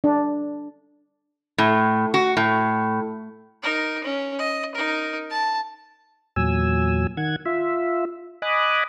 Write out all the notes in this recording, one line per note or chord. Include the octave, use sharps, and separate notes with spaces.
D4
A2
F#4
A2
D#4 A#4
C#4
D#5
D#4 A#4
A5
E2 A#2 F#3 G#5 E6
D#3 F#5 G#6
F4 E5
D#5 G#5 B5 D6 D#6 F#6